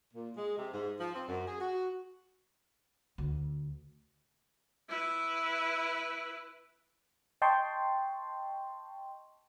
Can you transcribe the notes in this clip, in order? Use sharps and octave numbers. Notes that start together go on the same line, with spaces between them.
A#2
G#3
C3
G#2
F3
C4
F#2
G#4
F#4
D2
E4 B4
D#5 G5 A5 C6 C#6